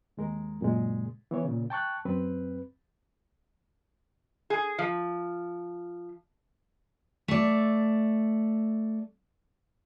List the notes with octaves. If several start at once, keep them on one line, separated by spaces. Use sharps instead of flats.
D#2 G#3 A#4
F#2 A#2 C#3 G#3
E3 B3 C#5
A#2 C#3
G5 A5 C#6 F#6
F#2 C4 B4
G#4
F3
A3 D5